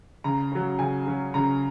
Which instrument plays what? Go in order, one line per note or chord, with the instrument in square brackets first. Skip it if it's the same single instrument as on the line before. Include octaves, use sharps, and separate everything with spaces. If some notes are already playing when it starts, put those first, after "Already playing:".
[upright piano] C#3 A#5
F#3 C#4
C#3 G#5
F#3 C#4
C#3 A#5